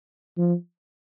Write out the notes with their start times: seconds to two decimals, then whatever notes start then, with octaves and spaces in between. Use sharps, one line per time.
0.38 F3